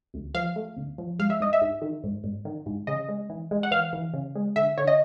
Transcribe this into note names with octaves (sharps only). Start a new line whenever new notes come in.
D2
F3 F5
A3
D2
F3
G#2 F5
E5
G#2 D#5
E5
G#2
D#3
G#2
G#2
D#3
G#2
C#3 D#5
G#3
E3
G#3
F#5
E3 F5
E3
C#3
G#3
D3 E5
D3 C#5
D#5